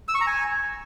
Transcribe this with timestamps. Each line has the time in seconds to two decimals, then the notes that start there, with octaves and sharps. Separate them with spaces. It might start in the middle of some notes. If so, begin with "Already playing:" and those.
0.08 E6
0.15 C#6
0.21 A#5
0.27 G#5